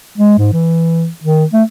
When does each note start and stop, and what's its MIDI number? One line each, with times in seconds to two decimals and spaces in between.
0.18 0.37 56
0.39 0.48 44
0.53 1.08 52
1.24 1.45 51
1.53 1.63 57